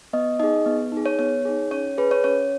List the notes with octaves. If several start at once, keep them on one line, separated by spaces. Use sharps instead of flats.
B3 D#5
D#4 G#4 D#5
B3
D#4 G#4
C#5
B3 C#5
D#4 G#4
C#4 C#5
G#4 B4
C#5
C#4 C#5